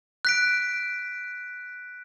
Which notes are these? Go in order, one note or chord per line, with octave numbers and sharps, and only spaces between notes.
F#6 B6 D7